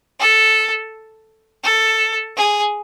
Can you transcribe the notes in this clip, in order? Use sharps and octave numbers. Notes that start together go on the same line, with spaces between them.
A4
A4
G#4